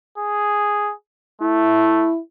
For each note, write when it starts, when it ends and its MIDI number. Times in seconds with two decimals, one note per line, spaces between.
0.18 0.92 68
1.42 2.10 57
1.42 2.19 64